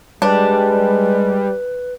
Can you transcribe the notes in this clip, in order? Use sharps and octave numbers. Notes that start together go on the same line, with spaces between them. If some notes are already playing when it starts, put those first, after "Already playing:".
G3 G#3 D4 B4